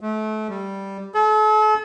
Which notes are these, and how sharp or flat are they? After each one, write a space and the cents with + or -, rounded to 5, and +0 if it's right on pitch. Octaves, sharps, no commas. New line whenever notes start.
A3 -30
G3 -5
A4 -40